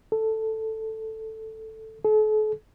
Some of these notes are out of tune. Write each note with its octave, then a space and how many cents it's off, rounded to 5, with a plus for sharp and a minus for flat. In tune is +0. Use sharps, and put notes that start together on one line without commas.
A4 +5
A4 -40